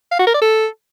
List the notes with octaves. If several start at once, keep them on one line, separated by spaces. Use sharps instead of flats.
F5
F#4
A#4
D5
A4